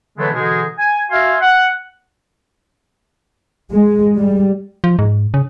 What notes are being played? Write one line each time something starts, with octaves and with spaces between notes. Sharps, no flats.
D3 E3 F#3 G#3 A3 B3
B2 D3 E3 G#3 D#4 G#4
G#5
F#4 E5 F5 G#5 C6 F6
F#5
G#3
G3
F3
G#2
C#3